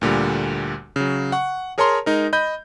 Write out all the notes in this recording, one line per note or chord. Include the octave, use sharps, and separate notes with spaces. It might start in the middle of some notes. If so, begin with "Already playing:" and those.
D2 A#2 D3 G3
C#3 F#3
F#5 C#6
G#4 A#4 C#5 A5 A#5 C6
G#3 D#4 A#4
D#5 B5 G6